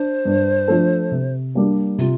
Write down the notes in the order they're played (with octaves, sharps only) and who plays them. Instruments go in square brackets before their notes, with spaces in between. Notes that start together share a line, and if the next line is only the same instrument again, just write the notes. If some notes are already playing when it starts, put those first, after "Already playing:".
Already playing: [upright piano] D4 [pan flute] C5
[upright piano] G2
F3 A3 D4 A4
C3
G3 A#3 D4
[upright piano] C3 [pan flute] F4